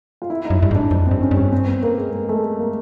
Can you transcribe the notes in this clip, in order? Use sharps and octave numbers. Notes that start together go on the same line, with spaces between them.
F4
E4
D#4
F#2
G2 E4
G#2
D4
F2 D4
G2 C4
C#4
G2
C#4
C4
B3
A#3
G#3
G#3
A3
A#3